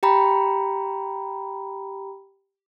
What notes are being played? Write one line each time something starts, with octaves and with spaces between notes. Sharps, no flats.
G4 G5 A#5 B5